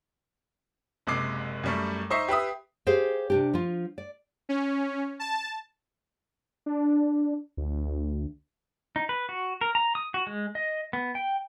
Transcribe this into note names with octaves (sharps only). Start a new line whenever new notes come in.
F#1 C3 G#3 D6 C7
F#2 G3 A3
D#4 C5 D#5 E5 C#6 C7
G4 B4 E5 D#6
G4 G#4 C5 F5
C3 D4 G4
F3 F4
D5
C#4
A5
D4
D2
D#4
B4
F#4
A#4
A#5
D#6
F#4
G#3
D#5
B3
G5